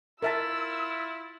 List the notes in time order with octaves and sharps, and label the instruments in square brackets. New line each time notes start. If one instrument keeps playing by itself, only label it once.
[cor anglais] E4 [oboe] F4 [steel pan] A#4 E5 A5 [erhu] E6